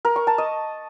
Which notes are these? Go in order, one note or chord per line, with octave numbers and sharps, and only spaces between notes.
A#4
C#6
A5
D#5